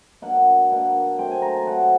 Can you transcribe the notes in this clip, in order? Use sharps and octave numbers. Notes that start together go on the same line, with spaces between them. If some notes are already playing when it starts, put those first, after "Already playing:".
B2 F#3 A#3 D4 F#5
B2 F#3 A#3 D4
F#3 A3 C4 G5
G#5
A#5
A5
F#3 A3 C4 F#5